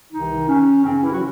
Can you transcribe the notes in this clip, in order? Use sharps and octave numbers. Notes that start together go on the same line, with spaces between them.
C2 C3 D#3 E3 D#4
C#4
F#2 C#3 E3 C4
C#4
E3 E4
F#3 F#4